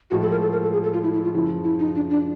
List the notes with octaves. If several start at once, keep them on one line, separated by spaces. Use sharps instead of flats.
A2 F3 G#3 F#4
A4
A#4
A4
A#4
A4
G#4
A4
F4
E4
E4
F4
F#2 C#3 F3 E4
E4
D#4
D4
D4